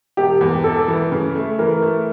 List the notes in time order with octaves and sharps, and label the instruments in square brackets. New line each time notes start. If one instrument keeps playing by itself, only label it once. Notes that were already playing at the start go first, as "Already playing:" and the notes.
[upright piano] E1 [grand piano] G4
[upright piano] E2
[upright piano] E1 [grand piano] A4
[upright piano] E3
C#3
A3
[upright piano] E3 [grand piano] A#4
[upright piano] A3